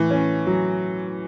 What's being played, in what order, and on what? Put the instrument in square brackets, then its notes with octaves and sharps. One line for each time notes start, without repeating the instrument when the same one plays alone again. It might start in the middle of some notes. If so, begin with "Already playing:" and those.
Already playing: [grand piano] A2 [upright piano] E3
[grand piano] C#4
F#3